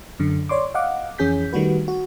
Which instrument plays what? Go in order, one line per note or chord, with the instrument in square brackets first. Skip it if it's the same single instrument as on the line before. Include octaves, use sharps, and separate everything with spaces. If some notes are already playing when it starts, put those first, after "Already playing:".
[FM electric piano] F#2 D3
C#5 D5 C6 D6
D#5 F5 F#5 D6
F2 E3 C#4 G#4 G6 B6
D#3 G3 A3 F#4 B4
F#4